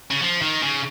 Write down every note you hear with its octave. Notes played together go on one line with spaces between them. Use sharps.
C#3
F3
D#3
C#3